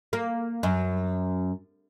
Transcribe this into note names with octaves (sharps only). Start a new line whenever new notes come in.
A#3
F#2